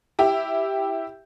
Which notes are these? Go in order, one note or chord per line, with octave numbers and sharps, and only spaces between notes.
E4 G4